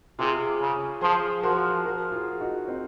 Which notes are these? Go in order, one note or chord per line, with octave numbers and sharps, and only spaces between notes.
C3 F4 G#4
C#3
F3 G#4 C5
F3 F#4 A#4
F#4 A#4
F4 G#4
D#4 F#4
C4 D#4